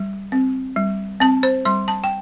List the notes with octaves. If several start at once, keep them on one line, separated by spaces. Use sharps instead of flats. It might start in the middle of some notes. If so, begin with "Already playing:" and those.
Already playing: G3
C4
G3
C4 A5
C5
G3 C6
A5
G5